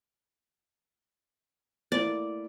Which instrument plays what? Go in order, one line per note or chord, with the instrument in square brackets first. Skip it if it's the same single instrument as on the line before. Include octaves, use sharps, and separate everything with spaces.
[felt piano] A3 A#3 E4 [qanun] D5